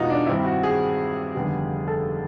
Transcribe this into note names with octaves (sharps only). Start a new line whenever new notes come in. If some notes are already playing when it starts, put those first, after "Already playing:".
Already playing: E1 E2 B2 G#3 D#4 F4 F#4
D4
G2 D#3 G3 C4 E4
F#4
G#4
F1 D#2 D3 G3 B3
A4